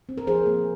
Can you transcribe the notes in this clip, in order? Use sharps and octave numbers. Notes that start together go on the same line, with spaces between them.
C4
A#4
F3 G#4 C5
A#3